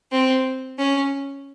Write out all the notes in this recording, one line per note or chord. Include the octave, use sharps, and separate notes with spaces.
C4
C#4